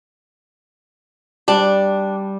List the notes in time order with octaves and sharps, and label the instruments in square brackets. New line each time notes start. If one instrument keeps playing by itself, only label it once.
[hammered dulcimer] G3 [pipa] D4